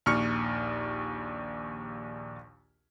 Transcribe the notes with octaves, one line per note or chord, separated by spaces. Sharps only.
A#1 D#2 C#6 F6 C#7